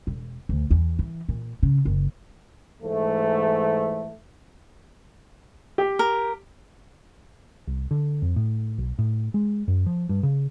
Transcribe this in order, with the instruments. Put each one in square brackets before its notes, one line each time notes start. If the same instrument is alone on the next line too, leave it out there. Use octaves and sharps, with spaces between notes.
[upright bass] E1
D2
E2
E3
A#2
C#3
F#1
[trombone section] G#2 E3 A3
[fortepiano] G4
[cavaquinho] A#4
[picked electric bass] C2
D3
F2
A2
B1
A2
G#3
F#2
F3
G2
C#3